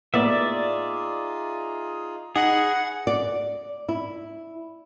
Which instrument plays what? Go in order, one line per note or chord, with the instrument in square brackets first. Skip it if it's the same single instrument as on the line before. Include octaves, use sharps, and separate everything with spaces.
[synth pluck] A2 A#3 B3 [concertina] D#4 F4 G#4 [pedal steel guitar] D5 E5
[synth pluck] D#4 [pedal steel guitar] G#4 [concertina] B4 D#5 [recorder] F#5
[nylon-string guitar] D5
E4